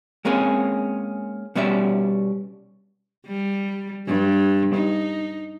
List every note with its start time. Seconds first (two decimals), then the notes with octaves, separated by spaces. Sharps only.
0.25 G#3 A#3 C4 C#4 G#4
1.55 B2 G3 C#4 D5 E5
3.26 G3
4.07 G2
4.74 D#4